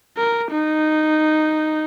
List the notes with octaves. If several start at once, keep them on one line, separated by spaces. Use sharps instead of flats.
A#4
D#4